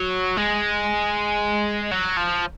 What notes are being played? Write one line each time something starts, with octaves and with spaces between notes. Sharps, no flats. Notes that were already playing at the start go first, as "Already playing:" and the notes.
Already playing: F#3
G#3
F#3
F3